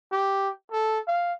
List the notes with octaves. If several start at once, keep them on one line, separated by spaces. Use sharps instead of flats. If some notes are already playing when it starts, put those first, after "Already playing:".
G4
A4
F5